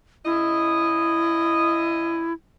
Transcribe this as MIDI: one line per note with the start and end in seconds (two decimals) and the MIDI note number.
0.25 2.25 49
0.25 2.33 64
0.25 2.25 75